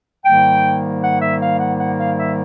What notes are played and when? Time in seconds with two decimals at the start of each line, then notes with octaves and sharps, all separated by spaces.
0.24 G#2 D#3 G3 A#3 G5
1.01 F#5
1.20 E5
1.40 F5
1.59 F#5
1.79 F#5
1.98 F5
2.17 E5